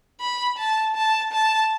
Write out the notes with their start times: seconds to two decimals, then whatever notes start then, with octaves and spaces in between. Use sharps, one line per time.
0.21 B5
0.58 A5
0.96 A5
1.32 A5